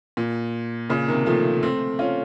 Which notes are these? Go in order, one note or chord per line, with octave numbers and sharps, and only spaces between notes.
A#2
A#2 C#3
C3 D#3
F3 A3
A3 C4
C#4 F4